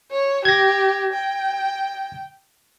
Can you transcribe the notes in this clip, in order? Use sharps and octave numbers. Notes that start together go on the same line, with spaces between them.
C#5
G4 G#6 A#6
G5